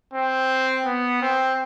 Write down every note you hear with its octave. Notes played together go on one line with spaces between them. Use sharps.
C4
B3
C4